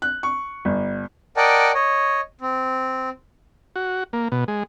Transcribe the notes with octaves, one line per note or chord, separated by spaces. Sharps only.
F#6
C#6
G1
A#4 D5 D#5 F#5 G5 A5
C#5 D#5
C4
F#4
A#3
B2
G#3